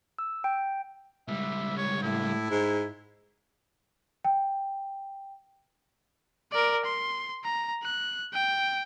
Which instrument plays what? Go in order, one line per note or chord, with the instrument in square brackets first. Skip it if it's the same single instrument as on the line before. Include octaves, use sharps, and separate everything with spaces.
[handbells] E6
G5
[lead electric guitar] C#2 G3 [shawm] E5
[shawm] C#5
[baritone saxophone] A2 [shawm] E4
[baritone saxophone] G#2
[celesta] G5
[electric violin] A#4 D5
C6
A#5
F#6
G5